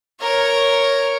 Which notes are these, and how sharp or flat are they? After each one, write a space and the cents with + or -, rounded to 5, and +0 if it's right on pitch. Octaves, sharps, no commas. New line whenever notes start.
A#4 +0 C#5 +0